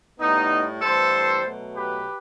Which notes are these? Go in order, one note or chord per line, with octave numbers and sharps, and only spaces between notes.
A2 G3 B3 D#4
G2 E3 A3 A4 C5
B2 F#3 A3
G4 B4